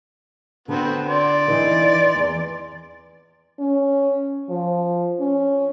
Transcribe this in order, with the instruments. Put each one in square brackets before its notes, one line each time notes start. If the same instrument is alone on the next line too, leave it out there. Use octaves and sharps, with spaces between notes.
[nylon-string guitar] D3 [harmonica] B3 C4 F#4
[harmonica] D5 C6
[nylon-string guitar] E3 D#4 B4
E2
[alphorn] C#4
F3
C#4